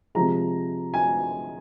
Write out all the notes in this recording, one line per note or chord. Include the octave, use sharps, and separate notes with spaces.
C3 F3 G#3 A#5
G#5